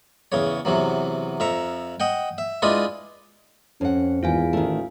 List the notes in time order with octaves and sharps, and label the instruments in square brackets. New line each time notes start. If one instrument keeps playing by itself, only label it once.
[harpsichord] E2 C#3 C#5
E2 C3 E3 F#3
F2 E5 A#5 C#6
D#5 F#5 G5
E5
G#3 D4 E4 F4 B4 D#5
[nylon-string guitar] F2 F#5 [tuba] C#4
[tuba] G#1 [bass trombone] E2 [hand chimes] F4 F5 G#5
[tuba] A1 [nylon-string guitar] D#3 A3